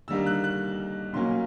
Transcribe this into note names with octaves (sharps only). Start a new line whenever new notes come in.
D#2 D3 G3 A#3 D#4 E6
F#6
F#6
B1 A#2 F#3 A#3 C#4 C6